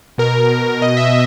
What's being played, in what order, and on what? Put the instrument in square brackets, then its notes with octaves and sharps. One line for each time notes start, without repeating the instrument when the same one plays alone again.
[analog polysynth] B2 A#4
B2
B2 D#5
E5